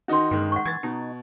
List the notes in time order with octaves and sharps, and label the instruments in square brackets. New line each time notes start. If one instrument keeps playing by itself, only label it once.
[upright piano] D#3 D#4 F#4 [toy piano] C#4 C6
[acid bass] G2 [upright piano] D#3 G#3
[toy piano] F#5 C#6
[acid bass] E3 [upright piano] G#6 A6
[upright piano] B2 [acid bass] D#4